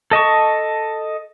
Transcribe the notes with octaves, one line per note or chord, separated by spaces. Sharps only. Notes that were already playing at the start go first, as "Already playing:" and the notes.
A4 D#5 A5 C#6